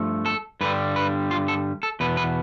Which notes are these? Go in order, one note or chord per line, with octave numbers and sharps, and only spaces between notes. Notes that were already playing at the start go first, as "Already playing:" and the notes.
Already playing: G2 F3 A3
A4
G2 D3 G3 B4
B4
F4
A4
A4
E2 B2 B3 B4
B4